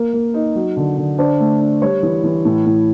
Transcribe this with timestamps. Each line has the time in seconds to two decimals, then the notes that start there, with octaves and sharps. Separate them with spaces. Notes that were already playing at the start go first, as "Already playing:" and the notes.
Already playing: A#3 A#4
0.13 A#3
0.34 D#4
0.55 F#3
0.76 D3
0.97 D3
1.18 D4 C5
1.40 A3
1.61 D4
1.82 G3 C#5
2.03 E3
2.23 E3
2.45 A2
2.66 A2